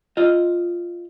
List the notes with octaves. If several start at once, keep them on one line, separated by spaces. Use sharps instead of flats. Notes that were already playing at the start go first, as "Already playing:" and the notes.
F4 D#5